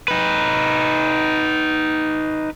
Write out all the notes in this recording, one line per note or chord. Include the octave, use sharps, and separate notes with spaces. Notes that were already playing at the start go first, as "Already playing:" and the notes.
D#4 B4